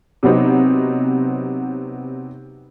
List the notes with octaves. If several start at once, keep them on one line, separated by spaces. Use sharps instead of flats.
C3 F#3 B3 C4 D#4